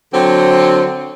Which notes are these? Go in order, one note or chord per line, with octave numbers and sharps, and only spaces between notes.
D3 F#3 C4